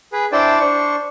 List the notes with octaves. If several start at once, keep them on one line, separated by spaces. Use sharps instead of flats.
G#4 B4
D4 E4 C5 D5 G5 A5
D4 C5 C#6